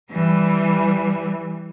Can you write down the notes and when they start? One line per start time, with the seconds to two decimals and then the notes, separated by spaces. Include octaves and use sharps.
0.11 E3 G3